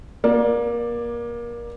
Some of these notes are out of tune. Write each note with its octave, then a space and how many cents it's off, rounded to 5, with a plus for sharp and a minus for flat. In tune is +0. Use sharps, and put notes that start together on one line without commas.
A#3 +25 D5 +0